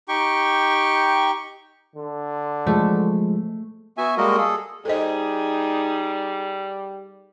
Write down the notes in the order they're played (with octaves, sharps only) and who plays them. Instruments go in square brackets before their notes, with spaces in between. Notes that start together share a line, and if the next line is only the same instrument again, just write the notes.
[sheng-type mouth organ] D#4 G4 G5 C#6
[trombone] D3
[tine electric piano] F3 G#3 [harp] A3
[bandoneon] B3 F#4 E5 G#5
G3 G#3 A#3 F#4 A#4 D#5
G#4 A4
[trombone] G3 [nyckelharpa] D#4 G#4 [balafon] A4 C5 D#5